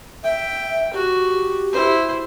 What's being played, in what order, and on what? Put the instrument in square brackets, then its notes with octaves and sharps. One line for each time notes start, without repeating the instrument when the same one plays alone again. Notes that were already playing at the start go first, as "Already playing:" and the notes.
[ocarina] E5 [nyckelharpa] G5
[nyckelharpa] F#4 [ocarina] G4
[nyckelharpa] E4 C5